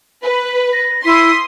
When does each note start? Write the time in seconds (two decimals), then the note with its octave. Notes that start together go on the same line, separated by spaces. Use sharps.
0.22 B4
0.73 A#6
1.05 E4 C6 D#6 B6